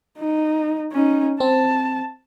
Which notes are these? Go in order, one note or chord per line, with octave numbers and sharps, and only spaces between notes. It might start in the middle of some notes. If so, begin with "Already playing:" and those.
D#4
C#4 D#4
C4 A5